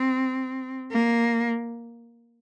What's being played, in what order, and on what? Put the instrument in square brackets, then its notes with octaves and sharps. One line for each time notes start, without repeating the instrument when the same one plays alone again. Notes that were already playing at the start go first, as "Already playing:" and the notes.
Already playing: [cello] C4
A#3